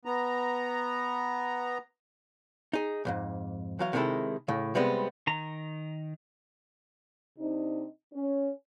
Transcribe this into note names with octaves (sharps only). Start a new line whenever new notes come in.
B3 A#5
D#4 G#4
C2 F2 G#2
E3 F#3 F5
C3 D#3 G#3 B3 E4 A4
A2 C#3
C3 G3 G#3 B3 C4
D#3 A#5
C3 C4 D4 D#4
C#4